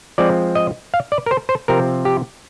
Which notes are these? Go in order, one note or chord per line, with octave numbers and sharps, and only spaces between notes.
F3 G#3 C4 D5
D#5
F5
D5
A#4
C5
C5
C3 F3 C4 A#4
G4